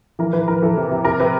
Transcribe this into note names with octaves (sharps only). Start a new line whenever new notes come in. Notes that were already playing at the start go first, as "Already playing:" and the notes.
E3 A#4
E3 B4
E3 A#4
E3 A4
C3
C3
C3 A#4
C3 B4